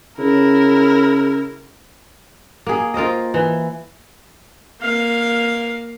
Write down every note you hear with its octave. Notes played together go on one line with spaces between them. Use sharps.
C#3 E4 A#4
A#3 G#4
F4 A#4 C5 D#5
E3
A#3 F5